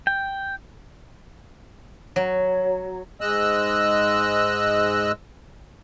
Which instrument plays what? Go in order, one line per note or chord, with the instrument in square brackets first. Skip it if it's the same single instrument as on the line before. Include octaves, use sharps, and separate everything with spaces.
[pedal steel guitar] G5
[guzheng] F#3
[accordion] G#2 G#3 D#5 E6 F#6